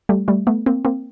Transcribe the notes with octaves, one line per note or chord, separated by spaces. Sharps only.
G3 A3
G3 A3
A3 B3
A#3 C4
A#3 C4